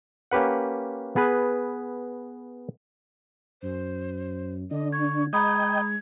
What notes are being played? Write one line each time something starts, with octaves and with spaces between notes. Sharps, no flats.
A#3 C#4 G4 B4 F#5
B3 G#4 B4
F#2 C5
D3 D4 D#5
C#6 G#6
G#3 D#5 G5 A#5 B5 D#6 G#6